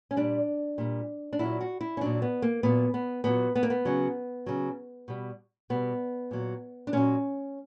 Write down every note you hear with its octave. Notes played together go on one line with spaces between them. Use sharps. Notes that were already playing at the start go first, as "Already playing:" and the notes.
C#4
A#2 G3 D4
A#2 G3
D4
A#2 F#3 E4
F#4
E4
C#4
A#2 F#3 D4
B3
A#3
A#2 F#3 B3
B3
A#2 F#3 B3
B3
A#3
B3
C#3 F#3
C#3 F#3
B2 G3
B2 G3 B3
A#2 F#3
D4
A#2 F#3 C#4